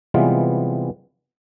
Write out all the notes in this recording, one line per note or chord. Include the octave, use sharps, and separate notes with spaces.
C3 E3 G3 G#3 B3 F4